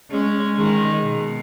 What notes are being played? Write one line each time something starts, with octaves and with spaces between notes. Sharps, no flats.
G#3 C#4
D#3 G#3
B2